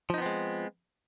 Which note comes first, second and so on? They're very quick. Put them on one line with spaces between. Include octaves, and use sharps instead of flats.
F3 D#4 B3 C4 G#3